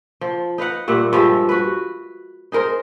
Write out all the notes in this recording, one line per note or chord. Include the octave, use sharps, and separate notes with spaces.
F3
D#4 B4 F5 F#5
G2 A#2 E5 F#5
G2 F3 G#3 E5
F#4 B4
D#4 G#4 A#4 C5